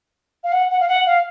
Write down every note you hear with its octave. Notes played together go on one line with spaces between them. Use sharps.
F5
F#5
F#5
F5
F#5
F5